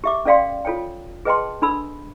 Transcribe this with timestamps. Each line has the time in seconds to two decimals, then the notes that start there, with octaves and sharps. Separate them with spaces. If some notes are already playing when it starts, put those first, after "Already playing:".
0.04 G4 E5 D6
0.25 C#4 A4 D5 F5 G5 C6
0.65 F4 A4 C#5 G5
1.25 G#4 B4 D#5 G5 A5 C6
1.62 D4 A4 B5 E6